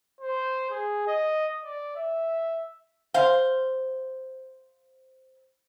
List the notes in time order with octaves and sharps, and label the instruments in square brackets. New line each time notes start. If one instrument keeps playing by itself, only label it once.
[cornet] C5
G#4
D#5
D5
E5
[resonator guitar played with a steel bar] C5 F5